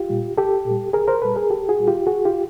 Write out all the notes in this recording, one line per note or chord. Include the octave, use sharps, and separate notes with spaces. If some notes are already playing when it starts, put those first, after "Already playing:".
Already playing: F4 G4
A#2 G3
C2 G4 A4
A#2 G3
C2 G#4 A#4
A#4 C5
A#2 G3 A4 B4
G#4 A#4
C2 G4 A4
F#4 G#4
A#2 G3
F4 G4
C#2 F#4 G#4
F4 G4